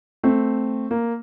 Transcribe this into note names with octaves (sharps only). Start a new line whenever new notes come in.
A3 C4
A#3